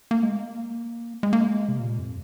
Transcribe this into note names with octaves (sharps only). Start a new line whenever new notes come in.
A#3
G#3
A#3
G#3
A#3
G#3
C3
A#2
F2